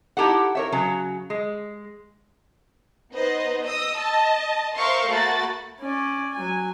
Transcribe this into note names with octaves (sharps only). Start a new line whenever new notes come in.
D#4 E4 G4 A4 F#5
A#4 C#5 E5
C#3 F#3
G#3
B3 D#4 B4 C5 D#5
D#5 D#6 E6
D#5 A5
A#4 C5 E5 F5 C6 C#6
A3 A#3 F#4 B5 A6
C#4 D5
F#3 G#5